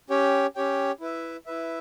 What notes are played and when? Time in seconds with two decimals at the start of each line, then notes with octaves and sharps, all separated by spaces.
0.10 C#4 G4 C#5 G5
0.56 C#4 G4 C#5 G5
1.00 E4 B4 E5
1.46 E4 B4 E5